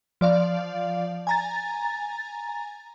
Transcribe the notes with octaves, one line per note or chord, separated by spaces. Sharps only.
F3 D5 F5
G#5 A#5 A6